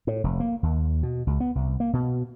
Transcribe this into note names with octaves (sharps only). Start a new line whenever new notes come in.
A2
F1
A#3
D#2
B2
C#2
B3
C2
A#3
B2